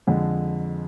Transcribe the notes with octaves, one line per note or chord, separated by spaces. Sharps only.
F2 D3 G#3